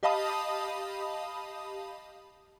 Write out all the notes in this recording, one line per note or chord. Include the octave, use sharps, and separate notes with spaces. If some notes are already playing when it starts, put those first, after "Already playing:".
G4 D#5 F5 A5 B5 D#6